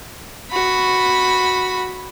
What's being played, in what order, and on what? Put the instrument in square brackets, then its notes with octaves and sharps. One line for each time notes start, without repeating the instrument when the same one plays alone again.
[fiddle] F#4 B5